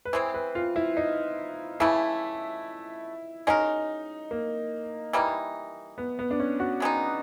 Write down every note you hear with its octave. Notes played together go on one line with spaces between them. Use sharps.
B4
E3 G#3 C4 C5
B4
F4
E4
D#4
C#3 E3 A3 E4
G#3 C#4 D#4 F#4 A#4
A#3
E3 G3 A#3 D#4
B3
B3
D4
C#4
F#4
D#3 G#3 B3 D#4